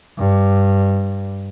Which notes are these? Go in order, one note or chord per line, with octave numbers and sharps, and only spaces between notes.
G2